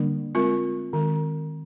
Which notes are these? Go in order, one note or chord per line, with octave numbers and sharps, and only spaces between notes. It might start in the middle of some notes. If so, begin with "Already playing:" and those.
Already playing: D3 G3 A#3 D4
G#3 C4 F4 A#4
D#3 G#3 C4